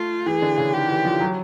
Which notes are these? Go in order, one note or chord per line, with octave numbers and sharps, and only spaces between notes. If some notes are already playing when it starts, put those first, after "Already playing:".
Already playing: A3 F4
E3 G#4
D3
C#3
D#3 G4
E3
F3
F#3